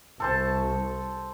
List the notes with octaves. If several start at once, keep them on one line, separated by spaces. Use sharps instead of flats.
C2 A4 C5 A5